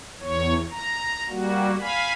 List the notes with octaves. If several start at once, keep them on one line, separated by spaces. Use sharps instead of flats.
E2 C#5
A#5
G3 A#3 F#4
F5 G#5 B5